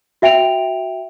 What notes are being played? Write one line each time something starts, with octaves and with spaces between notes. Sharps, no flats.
F#4 E5 G5 D7 F7